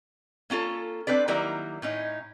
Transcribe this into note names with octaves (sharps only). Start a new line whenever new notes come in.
A#3 C#4 F4 A4
C4 D4 B4 D5
D#3 F#3 G3 A#3 E4 A#4
A2 C#4 D#4